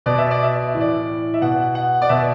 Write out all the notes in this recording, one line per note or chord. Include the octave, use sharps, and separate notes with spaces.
B2 D5
E5
D5
E5
D5
E5
A2 E3
D5
E5
B2 F#5
F#5
D5
B2 E5